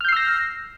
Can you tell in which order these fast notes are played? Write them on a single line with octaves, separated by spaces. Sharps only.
F6 G6 C7 E6 A#6